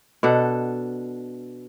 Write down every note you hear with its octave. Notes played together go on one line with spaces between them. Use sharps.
B2 D4 A4 F#5